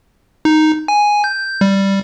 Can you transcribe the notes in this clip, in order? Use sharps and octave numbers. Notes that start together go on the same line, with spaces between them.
D#4
G#5
G6
G3